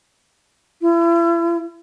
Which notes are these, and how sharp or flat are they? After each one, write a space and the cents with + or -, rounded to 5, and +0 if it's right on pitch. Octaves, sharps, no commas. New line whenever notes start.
E4 +40